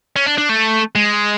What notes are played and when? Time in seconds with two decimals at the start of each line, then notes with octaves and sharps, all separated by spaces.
0.16 C#4
0.26 D4
0.38 D4
0.49 A3
0.95 G#3